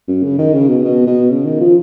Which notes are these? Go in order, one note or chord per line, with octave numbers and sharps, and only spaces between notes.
F#2
C#3
D#3
C#3
B2
B2
B2
C#3
D#3
F3